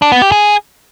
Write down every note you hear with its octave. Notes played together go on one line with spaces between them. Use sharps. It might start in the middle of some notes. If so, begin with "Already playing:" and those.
D4
B3
G4
G#4